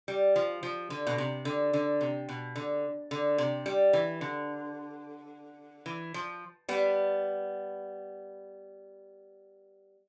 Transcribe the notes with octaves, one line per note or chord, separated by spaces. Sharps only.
G3
F3
F3
D3
B2
C3
D3
D3
C3
B2
D3
D3
C3
G3
E3
D3
E3
F3
G3 B3